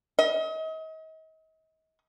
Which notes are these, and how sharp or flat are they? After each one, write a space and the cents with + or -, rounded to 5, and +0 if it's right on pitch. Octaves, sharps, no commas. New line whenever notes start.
D#5 +40